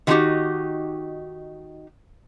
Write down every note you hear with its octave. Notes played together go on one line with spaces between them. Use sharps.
D#3 G#3 A3 D#4 F#4 G4